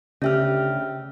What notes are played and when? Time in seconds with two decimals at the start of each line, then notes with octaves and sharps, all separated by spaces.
0.22 D2 C#3 C#4 G4 E5 F6